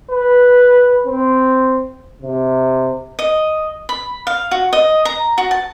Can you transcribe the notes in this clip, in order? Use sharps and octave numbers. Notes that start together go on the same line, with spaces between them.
B4
C4
C3
D#5
B5
F5
F#4
D#5
A#5
F#4
A5